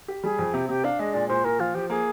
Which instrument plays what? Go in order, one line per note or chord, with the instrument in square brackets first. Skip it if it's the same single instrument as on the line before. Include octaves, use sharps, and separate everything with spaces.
[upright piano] G4
[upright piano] G3 [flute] G#4
[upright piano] F2
[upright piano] C3 [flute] G4
[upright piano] C3 [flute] G4
[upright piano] D4 [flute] F5
[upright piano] G#3 [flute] D#5
[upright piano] A#2 [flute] D5
[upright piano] A#2 [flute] C5
[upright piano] A#2 [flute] A#4
[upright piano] F3 [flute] F4
[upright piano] F3 [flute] G4
[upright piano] A#3 [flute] G#4